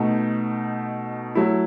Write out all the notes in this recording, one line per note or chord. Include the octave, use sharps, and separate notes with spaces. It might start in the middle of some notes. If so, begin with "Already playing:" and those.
Already playing: B2 A3 D#4
F#3 A3 E4